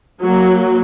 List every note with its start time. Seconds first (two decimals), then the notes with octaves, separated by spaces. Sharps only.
0.23 F#3 A#3